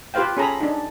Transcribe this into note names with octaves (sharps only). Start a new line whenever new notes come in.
F4 G4 B4 C5 F5 G5
C#4 G#4 A4 A#5 B5
D4 D#4